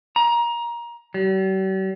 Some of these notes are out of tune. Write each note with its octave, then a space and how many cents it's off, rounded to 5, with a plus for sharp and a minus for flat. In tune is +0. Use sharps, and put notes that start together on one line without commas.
A#5 +20
G3 -45